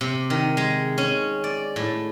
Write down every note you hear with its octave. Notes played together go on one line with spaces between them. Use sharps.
C3
D#3
G#3
C#4
D5
A2